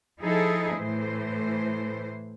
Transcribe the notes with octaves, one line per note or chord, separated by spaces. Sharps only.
F3 D#4 E4 G#4 A4
A2 E3 C5